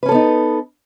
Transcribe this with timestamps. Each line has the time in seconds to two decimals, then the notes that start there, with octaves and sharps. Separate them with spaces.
0.03 B4
0.06 C#4
0.09 A4
0.12 B3
0.15 D#4